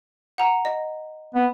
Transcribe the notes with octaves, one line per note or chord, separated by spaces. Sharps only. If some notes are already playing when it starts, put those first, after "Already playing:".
F#5 A#5
D#5
B3